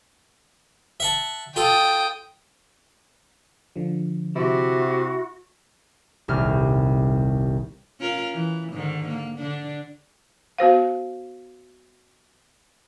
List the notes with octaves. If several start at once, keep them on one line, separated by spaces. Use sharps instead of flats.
E5 F#5 A5
F4 A4 G5 D#6
D3 F3
C3 E4 F#4
D#1 C2 F6
C#4 F4 A#4
E3
G#2 D3 D#3
A#3
D3 D4
B3 F#4 C5 F5